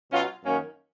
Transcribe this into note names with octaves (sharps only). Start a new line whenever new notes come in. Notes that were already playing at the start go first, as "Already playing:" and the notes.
B2 F#3 C#4 F4
F#2 D#3 F#3 A#3 C#4